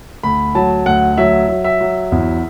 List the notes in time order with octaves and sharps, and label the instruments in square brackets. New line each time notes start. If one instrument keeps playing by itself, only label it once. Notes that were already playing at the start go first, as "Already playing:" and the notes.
[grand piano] D2 B5
F#3 A5
D2 F#5
F#3 E5
F#3
E5
F#3
E2